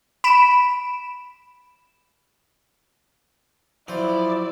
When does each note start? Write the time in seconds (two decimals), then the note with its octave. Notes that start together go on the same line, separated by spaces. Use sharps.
0.24 B5 D7 E7
3.88 F3 F#3 E4 C5 D5